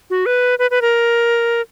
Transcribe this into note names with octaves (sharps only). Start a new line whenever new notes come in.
F#4
B4
B4
B4
A#4